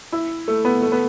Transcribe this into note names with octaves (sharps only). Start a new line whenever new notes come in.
E4
A3
B3
A3
B3